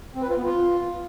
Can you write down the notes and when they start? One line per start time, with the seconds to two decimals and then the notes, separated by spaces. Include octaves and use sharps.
0.15 C4
0.22 B4
0.29 F4
0.36 B3
0.43 F4